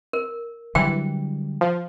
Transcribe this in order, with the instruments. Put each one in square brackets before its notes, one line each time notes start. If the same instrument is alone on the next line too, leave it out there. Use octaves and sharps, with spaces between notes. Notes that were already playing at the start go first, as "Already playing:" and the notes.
[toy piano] A#4
[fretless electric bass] D3 F#3 G3 [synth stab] E3 [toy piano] G5
[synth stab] F3